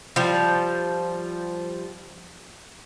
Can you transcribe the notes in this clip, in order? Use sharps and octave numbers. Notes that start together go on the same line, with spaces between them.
F3 G3